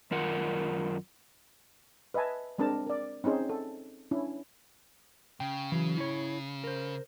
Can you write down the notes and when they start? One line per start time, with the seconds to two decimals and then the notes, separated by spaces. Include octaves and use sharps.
0.11 F#2 D#3 F4 A#4 F#5
2.14 B4 D#5 E5 G#5 A5
2.58 G#3 C4 D4 A#4 A5
2.87 A#4 D5
3.24 C4 C#4 D#4 G#4 C5
3.49 A4
4.11 C#4 D4 E4
5.40 C#3 G5
5.72 E3 F#3
5.98 E4 C#5
6.64 A#4 C5